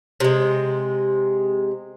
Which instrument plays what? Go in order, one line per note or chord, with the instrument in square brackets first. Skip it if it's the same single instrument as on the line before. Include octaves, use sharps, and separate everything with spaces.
[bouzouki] C3 G#3